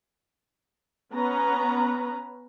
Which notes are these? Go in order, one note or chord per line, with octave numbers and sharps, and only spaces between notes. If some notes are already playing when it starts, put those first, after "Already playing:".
B3 C#4 B4 A#5